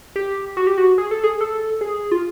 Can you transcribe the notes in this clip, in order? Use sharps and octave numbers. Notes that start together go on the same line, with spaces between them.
G4
F#4
G4
F#4
G#4
A4
G#4
A4
G#4
F4